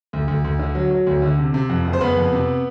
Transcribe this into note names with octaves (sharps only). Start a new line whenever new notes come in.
D2
D2
D2
D3
F#3
F#3
D2
D3
C3
C3
F2
F#1
C5
F#1 B3 B4
F2
C3